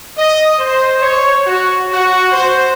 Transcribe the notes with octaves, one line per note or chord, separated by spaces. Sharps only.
D#5
C5
C#5
F#4
F#4
C5